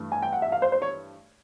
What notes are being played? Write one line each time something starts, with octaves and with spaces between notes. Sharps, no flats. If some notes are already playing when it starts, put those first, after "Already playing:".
Already playing: G2 E3 A3
G#5
G5
F#5
E5
F5
C5
C5
C#5